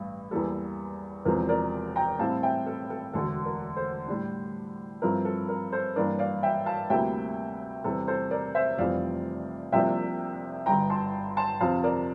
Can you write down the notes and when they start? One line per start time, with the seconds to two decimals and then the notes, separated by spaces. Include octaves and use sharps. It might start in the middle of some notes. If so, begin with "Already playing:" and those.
Already playing: A1 G2
0.31 E2 E3 G3 A#3 A4
1.25 E1 E2 C3 F3 C4 A#4
1.49 A#4 D5
1.96 G5 A#5
2.19 A2 G3 C4 E4 F5 A5
2.43 E5 G5
2.66 A4
2.90 A4
3.13 E1 D2 D3 A3 A4
3.45 A#4
3.76 A4 C5
4.08 A2 G3 D4
5.02 G2 F3 C4 E4 A#4
5.25 A4
5.48 A#4
5.72 A4 C5
5.96 G2 E3 A#3 D4 A#4 D5
6.19 D5 F5
6.43 E5 G5
6.66 F5 A5
6.90 D2 C3 G3 A#3 E4 E5 G5
7.84 E2 C3 G3 A4
8.08 A4 C5
8.31 A#4 D5
8.55 C5 E5
8.78 F1 F2 E3 G3 C4 D5 F5
9.72 C2 C3 F3 A#3 D4 E5 G5
10.66 G1 G2 D3 G5 A#5
10.90 A5 C6
11.37 A5 C6
11.60 F2 C3 F3 C4 F5 A5
11.84 A#4 D5